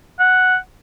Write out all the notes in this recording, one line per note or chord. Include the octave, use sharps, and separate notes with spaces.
F#5